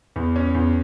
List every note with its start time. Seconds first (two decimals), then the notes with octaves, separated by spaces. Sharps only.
0.16 E2
0.36 C#4
0.55 E2